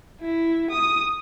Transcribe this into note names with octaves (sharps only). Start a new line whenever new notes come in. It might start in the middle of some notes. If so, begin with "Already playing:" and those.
E4
D#6